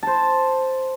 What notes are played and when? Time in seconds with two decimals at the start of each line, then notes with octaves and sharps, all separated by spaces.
0.03 C5 A5